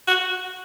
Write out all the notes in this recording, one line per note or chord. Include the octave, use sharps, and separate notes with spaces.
F#4